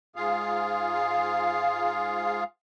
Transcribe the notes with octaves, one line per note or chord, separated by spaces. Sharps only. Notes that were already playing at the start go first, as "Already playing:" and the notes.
G#2 F4 G#4 F5